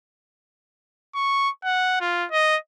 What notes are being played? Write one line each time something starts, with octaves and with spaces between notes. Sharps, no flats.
C#6
F#5
F4
D#5